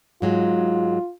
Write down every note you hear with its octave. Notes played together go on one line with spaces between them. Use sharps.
G#2 F#3 G#3 F4